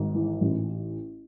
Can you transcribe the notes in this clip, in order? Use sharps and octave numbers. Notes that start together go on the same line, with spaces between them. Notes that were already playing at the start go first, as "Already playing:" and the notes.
Already playing: G#1 G#2
E3
A1